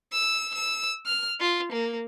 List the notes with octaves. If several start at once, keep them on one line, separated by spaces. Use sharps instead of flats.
E6
E6
F6
F4
A#3